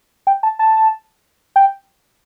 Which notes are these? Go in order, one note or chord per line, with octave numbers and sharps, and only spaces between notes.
G5
A5
A5
G5